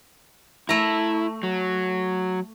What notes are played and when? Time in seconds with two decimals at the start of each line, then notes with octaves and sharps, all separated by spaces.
0.69 A3 E4 A#5
1.43 F#3